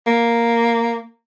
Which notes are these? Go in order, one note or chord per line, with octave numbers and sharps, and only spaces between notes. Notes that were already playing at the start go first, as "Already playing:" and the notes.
A#3